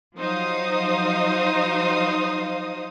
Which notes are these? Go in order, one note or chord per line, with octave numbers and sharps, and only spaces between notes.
F3 F#3 D#4 C5 F5 D#6